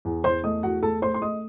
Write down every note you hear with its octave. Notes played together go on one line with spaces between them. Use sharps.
E2
E2 C5 C6
A3 D#5 D#6
E2 F#4 F#5
A3 A4 A5
A3 C5 C6
C6
A3 D#5 D#6